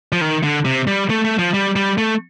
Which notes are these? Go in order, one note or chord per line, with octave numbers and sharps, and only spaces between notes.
F3
D#3
D3
C3
G3
A3
A3
F3
G3
G3
A3